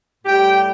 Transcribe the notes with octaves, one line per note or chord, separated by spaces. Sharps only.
A2 G3 G4 G5